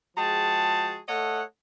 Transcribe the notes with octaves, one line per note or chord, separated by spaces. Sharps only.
F3 G#3 F#4 G#4 G5 A5
A3 A4 C#5 D#5 F#5